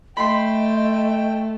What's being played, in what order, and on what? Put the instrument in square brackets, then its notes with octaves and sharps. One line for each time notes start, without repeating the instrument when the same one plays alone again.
[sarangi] A3 [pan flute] D#5 [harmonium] G5 [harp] B5 C6